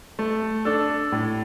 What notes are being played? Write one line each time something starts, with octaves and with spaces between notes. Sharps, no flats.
A3
D4 A4
A2